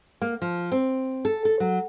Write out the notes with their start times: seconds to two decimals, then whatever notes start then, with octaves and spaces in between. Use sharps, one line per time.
0.22 A#3
0.42 F3
0.72 C4
1.25 A4
1.45 A4
1.60 F#3